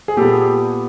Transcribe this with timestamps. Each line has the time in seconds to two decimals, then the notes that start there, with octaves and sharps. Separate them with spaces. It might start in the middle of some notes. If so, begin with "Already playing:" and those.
0.08 G#4
0.17 A#2 G3 B3 G4 A4